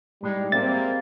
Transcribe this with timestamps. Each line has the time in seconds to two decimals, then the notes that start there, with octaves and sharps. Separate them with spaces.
0.23 A2 G3 G#3 D#4
0.52 G#3 A#3 C4 E5 A6